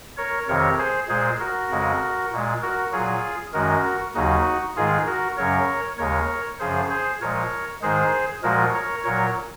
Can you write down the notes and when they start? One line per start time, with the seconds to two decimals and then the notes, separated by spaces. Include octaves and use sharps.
0.17 A#4 C#5
0.48 F2 C3 D#3 A#4 C#5
0.78 G#4 C5
1.09 A#2 G#3 G#4 C5
1.40 F#4 A#4
1.71 F2 C#3 G#3
2.32 A#2 G#3
2.62 F#4 A#4
2.93 A#2 F#3 F4 G#4
3.53 F#2 D#3 G#3 F#4 A#4
4.15 D#2 C#3 F#3 D#4 F#4
4.76 G#2 D#3 G#3 F4 G#4
5.06 F#4 A#4
5.37 F#2 C#3 F#3 A#4 C#5
5.98 D#2 C#3 G#3 A#4 C#5
6.60 F#2 C#3 F3 G#4 C5
6.90 G#4 C5
7.21 A#2 F3 G#3 A#4 C#5
7.82 G#2 D#3 G#3 G#4 C5
8.43 A#2 F3 G#3 F#4 A#4
8.74 A#4 C#5
9.04 A#2 F#3 A#4 C#5